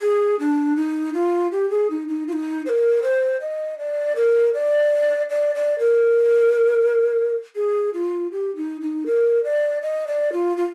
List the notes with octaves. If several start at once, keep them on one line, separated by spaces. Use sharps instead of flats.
G#4
D4
D#4
F4
G4
G#4
D#4
D#4
F4
D#4
C5
A#4
C5
D#5
D5
A#4
D5
D5
D5
A#4
G#4
F4
G4
D#4
D#4
A#4
D5
D#5
D5
F4
F4